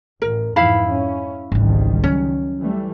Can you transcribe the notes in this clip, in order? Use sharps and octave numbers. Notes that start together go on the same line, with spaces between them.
A1 A#4
F2 G#2 E3 E4 F5 B5
C#4
G#1 C#2 D#3 E3 G3
F#3 C#4
E3 G3 A3